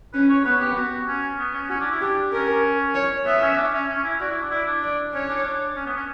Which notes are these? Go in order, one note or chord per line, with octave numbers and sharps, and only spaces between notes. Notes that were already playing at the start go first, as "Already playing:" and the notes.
C#4 B4
C#5
B3 B4
G4
F#4
C#4
B3
C#4
C#4 F#4
D4
E4
D4 G4
C#4 A#4
C#5
B3 E5
C#4
D4
C#4
C#4
E4
F#4 D5
E4
D4
E4 D5
D4
D5
C#4 C#5
D4
D4
C#4
B3
C#4